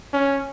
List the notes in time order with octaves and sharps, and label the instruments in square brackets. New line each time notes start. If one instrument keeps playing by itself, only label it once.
[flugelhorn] C#4